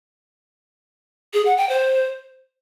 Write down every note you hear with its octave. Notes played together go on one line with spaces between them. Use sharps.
G#4
F#5
G5
C5